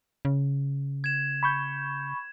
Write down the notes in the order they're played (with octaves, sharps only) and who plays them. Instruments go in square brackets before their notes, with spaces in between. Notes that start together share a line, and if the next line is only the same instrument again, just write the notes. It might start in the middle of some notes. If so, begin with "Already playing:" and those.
[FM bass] C#3
[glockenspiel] G#6 E7
[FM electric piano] B5 C#6 G6